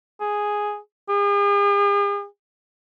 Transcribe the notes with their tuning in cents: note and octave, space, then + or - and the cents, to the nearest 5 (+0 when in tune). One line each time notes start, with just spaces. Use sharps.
G#4 +0
G#4 -45